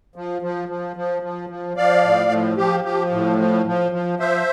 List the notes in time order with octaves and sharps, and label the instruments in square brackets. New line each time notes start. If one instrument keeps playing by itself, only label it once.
[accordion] F3
F3
F3
F3
F3
F3
F3 D5 F5
A2
F3
F3 G4
F3 G4
A2
F3
F3
F3
F3 C5 E5